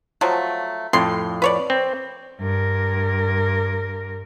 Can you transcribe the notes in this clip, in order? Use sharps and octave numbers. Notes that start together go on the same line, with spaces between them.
F3 F#3 A3
F2 A2 C6
B4 C#5 D5
C4
G2 A#4